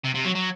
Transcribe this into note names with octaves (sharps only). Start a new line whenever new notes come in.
C3
C3
F#3
F#3